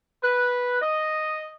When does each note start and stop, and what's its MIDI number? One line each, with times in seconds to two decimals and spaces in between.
0.23 0.79 71
0.81 1.52 75